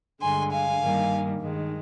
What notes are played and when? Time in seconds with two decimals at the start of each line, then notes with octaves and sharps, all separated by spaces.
0.21 G2 D3 G#3 G#5 C6
0.51 F5 G#5
0.80 G2 D#3 G3 A#3
1.40 G2 D#3 G#3